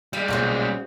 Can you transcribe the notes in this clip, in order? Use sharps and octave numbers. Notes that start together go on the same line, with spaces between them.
G3 G#3 F5
B1 A#2 C#3 C4 F#4